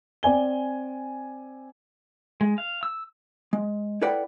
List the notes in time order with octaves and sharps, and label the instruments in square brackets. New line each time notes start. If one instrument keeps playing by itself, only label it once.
[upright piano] C4 D5 G#5 G7
[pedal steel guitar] G#3
F5
E6
[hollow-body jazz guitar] G#3
E4 A4 B4 D5 F#5 G5